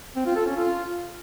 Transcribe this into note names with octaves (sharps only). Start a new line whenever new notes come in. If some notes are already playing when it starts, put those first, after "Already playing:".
C4
F4
A4
C#4
F4